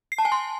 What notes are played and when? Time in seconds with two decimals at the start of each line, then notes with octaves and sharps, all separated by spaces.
0.12 C7
0.18 A5
0.25 G#5
0.32 C6